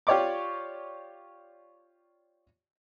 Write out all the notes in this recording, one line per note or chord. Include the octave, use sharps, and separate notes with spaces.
F4 G4 C#5 D5 C#6 D6